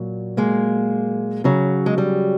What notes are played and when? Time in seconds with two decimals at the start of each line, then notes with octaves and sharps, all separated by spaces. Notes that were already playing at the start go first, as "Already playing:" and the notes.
Already playing: A#2 F#3
0.37 G#3 A#3
1.44 C#3 F#3
1.86 G#3
1.98 G3